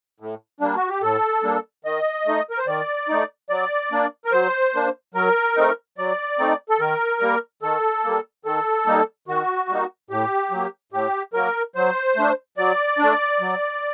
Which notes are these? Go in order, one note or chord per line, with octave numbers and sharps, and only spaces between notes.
A2
G3 A#3 D4
F#4
G4
A2 A4
G3 A#3 D4
D#3 D#5
A3 D#4
A#4
C5
D#3 D5
A3 D#4
F#3 D5
A#3 D4
A#4
F#3 C5
A#3 D4
F#3 A#4
A3 C4 D#4
F#3 D5
A3 C4 D#4
A4
D#3 A#4
G3 A#3
D#3 A4
G3 A#3
D#3 A4
G3 A#3 D#4
D#3 F#4
G3 A#3 D#4
A2 G4
F#3 A#3
A2 G4
F#3 A#3 A#4
F#3 C5
A3 D4
F#3 D5
A3 D4
F#3